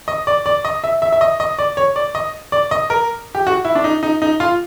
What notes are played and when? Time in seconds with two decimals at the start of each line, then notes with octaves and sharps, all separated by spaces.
0.08 D#5
0.27 D5
0.46 D5
0.65 D#5
0.84 E5
1.02 E5
1.12 E5
1.21 D#5
1.40 D#5
1.59 D5
1.77 C#5
1.96 D5
2.15 D#5
2.52 D5
2.71 D#5
2.90 A#4
3.35 G4
3.47 F#4
3.65 E4
3.75 D4
3.84 D#4
4.03 D#4
4.22 D#4
4.40 F4